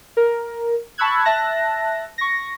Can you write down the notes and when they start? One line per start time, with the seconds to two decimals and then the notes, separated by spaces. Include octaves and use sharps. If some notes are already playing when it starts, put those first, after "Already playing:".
0.17 A#4
0.98 A5 B5 C#6 E6 F#6 G#6
1.25 E5 A5 F#6 A#6
2.18 C#6 A#6